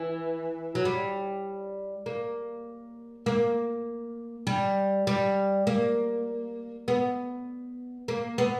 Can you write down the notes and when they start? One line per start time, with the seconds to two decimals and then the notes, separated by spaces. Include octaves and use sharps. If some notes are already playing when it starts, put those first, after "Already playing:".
Already playing: E3
0.75 F#3
0.85 G3
2.06 A#3
3.26 A#3
4.47 G3
5.07 G3
5.67 A#3
6.88 B3
8.08 A#3
8.38 B3